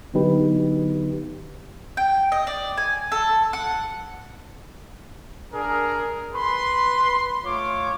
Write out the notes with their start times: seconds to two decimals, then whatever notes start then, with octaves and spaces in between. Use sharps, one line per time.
0.14 D3 F#3 B3 D#4 G4 B4
1.97 G5
2.32 D#5
2.47 D5
2.77 G#5
3.12 A4
3.53 F#5
5.52 D4 G#4 A#4
6.34 B4 B5 C6
7.44 A3 F4 C#5 D6